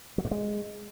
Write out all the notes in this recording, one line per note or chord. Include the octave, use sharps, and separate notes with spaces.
F#3
G2
G#3